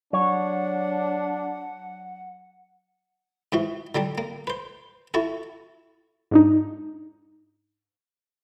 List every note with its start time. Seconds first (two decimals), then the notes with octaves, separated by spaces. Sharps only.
0.13 F#3 D4 C#5 F#5
3.52 G#2 E3 F#4
3.95 D3 F#3 G3 D4
4.18 A#3
4.47 B4 C5
5.14 E4 F#4 A4
6.31 G#2 D4 D#4